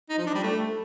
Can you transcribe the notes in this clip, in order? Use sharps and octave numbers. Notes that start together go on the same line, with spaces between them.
D#4
F3
D4
G3
A3